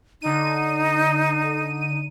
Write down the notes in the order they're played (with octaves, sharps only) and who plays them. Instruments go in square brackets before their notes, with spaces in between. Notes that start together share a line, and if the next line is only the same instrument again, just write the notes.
[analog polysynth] D3 D#7 [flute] D#4